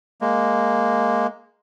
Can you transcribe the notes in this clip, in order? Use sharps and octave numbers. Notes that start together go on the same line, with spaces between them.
G#3 A#3